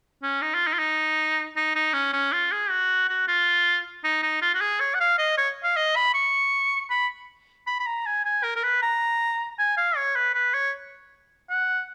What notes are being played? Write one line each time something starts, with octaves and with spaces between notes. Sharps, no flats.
C#4
D#4
F4
D#4
F4
D#4
D#4
D#4
C#4
C#4
F4
G#4
F#4
F#4
F4
D#4
D#4
F4
F#4
G#4
C#5
F#5
F5
D#5
C#5
F5
D#5
B5
C#6
B5
B5
B5
A#5
G#5
G#5
A#4
A#4
B4
A#5
G#5
F5
C#5
B4
B4
C#5
F#5